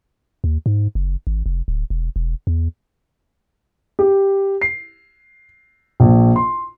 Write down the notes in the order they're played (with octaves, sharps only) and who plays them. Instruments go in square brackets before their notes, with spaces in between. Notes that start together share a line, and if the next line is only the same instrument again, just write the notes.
[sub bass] D#2
G#2
F#1
G#1
F1
D1
E1
E1
E2
[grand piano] G4
C7
A#1
C6